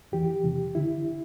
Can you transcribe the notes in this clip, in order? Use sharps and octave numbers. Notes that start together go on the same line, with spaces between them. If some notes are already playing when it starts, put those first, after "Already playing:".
F2 E3 G4
E2 C3 E3
D3 E4